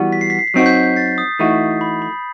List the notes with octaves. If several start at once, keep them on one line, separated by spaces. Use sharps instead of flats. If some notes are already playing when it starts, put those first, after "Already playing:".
Already playing: E3 G3 B3 F#4
B6
C7
B6
C7
B6
F#3 C4 D#4 F#4 C7
G6 B6
A6 C7
D#6
E3 A3 D#4 F#4
B5
B5